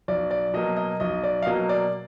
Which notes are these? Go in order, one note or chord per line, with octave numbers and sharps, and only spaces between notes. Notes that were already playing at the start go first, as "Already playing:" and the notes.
B1 D5
D5
B2 F#3 A#3 D#5
D#5
B1 D#5
D5
F5
B2 F#3 A#3 D#5
D5